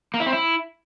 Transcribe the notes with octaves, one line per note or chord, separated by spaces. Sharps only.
A#3
E4
C4
E4